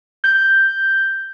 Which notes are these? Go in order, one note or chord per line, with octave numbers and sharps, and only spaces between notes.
G6